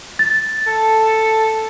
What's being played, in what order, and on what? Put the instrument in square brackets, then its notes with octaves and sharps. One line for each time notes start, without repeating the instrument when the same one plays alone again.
[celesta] A6
[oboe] A4